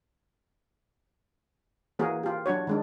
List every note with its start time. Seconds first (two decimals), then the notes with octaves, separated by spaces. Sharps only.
1.99 E3 A#3 F#4 G#4 A#4
2.23 F4 G4
2.46 F#3 D4 F#4 C#5
2.67 D#3 G#3 D4